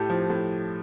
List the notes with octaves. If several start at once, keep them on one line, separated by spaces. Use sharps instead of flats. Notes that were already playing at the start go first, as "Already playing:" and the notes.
Already playing: A2 G4 A4
F3
A2